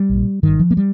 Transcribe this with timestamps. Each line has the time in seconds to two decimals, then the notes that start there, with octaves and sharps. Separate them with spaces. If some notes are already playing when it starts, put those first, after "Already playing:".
Already playing: G3
0.09 A#1 A#2
0.43 G1 G2 D#3
0.59 F3
0.71 A#3
0.77 G3